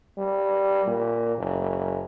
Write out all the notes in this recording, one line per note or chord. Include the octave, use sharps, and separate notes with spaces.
G3
A#2
F#1